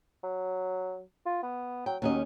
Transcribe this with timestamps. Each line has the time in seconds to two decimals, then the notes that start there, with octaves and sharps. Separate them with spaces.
0.24 F#3
1.26 F4
1.43 B3
1.86 F#3 G5
2.02 D#2 F#3 C#4 D#5